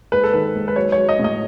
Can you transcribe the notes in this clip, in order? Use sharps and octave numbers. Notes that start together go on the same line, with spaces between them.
G#2 B4
A4
D#3 B4
G#2
B4
F#3 C#5
C#5
F#3
D#5
A2
D#5